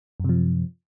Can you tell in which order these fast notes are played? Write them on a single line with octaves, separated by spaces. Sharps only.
F#2 C3 F3